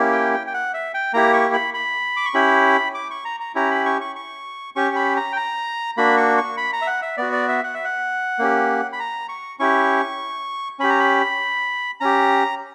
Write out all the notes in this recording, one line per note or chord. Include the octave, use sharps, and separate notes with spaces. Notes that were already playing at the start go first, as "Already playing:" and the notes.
Already playing: A#3 C#4 E4 G4
G5
G5
G5
F#5
E5
G5
A#3 E4 G4 A#5
C#6
B5
B5
D6
C#6
C#4 E4 G4 B5
D6
C#6
A#5
A#5
C#4 E4 G4 A#5
B5
C#6
C#6
C#6
C#4 G4 C#6
C#6
B5
A#5
G5
A#5
A#3 D4 F#4 B5
C#6
C#6
B5
A#5
E5
F#5
E5
B3 F#4 D5
D5
E5
F#5
E5
F#5
A#3 C#4 G4
B5
A#5
C#6
C#4 E4 G4 C#6
C#4 G4 B5
A#5
B5
C#4 G4 A#5